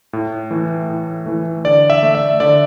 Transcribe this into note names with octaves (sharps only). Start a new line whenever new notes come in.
A2
E3 A3
A2
E3 A3
D3 D5
E5
A3
E5
D3 D5